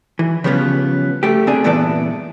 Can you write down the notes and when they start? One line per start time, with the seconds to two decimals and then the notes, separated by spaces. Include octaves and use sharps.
0.19 E3
0.44 C#3 F3 G3 B3 C#4
1.23 A3 G4
1.47 C3 D4 G#4
1.64 G2 A#2 E3 B3 D5 A5